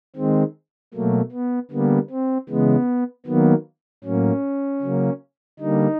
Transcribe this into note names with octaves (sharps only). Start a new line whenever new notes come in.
D#3 G#3 C4
B2 F#3 A3 A#3
B3
D3 G3 A#3 B3
C4
C#3 E3 G#3 B3
D#3 F#3 A#3 B3
A2 F#3 A#3 C#4
C#3 F#3 A#3
D3 G3 A#3 D#4